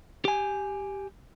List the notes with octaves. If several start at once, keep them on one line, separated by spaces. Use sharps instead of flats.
G4 G#5